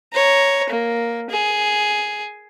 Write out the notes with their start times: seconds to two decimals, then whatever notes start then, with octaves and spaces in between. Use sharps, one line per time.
0.13 C#5 A#5
0.70 A#3
1.30 G#4